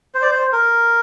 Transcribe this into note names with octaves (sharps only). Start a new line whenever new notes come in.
C5
D5
C5
A#4